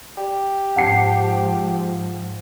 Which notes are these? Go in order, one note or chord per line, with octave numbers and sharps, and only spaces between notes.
G4
G#2 F3 F#5 A5 C7